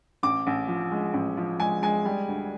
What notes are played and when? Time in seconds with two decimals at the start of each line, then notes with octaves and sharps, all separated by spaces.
0.23 A1 D6
0.47 A1
0.68 F3
0.91 G#3
1.14 A1
1.37 F3
1.60 G#3 G#5
1.82 G#3 G#5
2.05 G3
2.28 D2